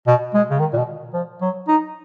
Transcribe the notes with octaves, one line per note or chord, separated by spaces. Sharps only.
B2
G#3
C#3
D#3
A#2
B2
F3
F#3
D#4